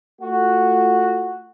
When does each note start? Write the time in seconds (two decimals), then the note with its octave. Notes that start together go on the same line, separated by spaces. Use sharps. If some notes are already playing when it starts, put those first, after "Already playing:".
0.21 A3 F4 F#4